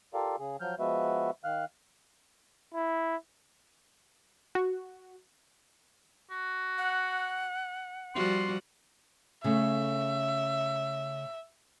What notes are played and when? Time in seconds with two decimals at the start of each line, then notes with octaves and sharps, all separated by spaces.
0.14 F4 G4 A4 A#4 D5 F5
0.39 C#3 G#4
0.60 F3 F#3 F6 G6
0.79 F3 G#3 B3 F#4 B4 E5
1.44 D#3 F5 F6 F#6
2.74 E4
4.55 F#4
6.31 F#4
6.78 F#5
8.15 F3 G3 F#4 C6
9.44 C#3 A3 E5